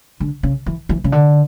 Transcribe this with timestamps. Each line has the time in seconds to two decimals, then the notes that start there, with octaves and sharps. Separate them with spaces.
0.20 D3
0.43 C#3
0.66 E3
0.89 E3
1.04 C#3
1.12 D3